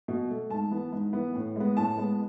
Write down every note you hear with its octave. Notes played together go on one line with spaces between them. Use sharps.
B2
A3
G#2 A5
E3 B3
G#2
E3 B3
A2
G#3 B3
A2 A5
G#3 B3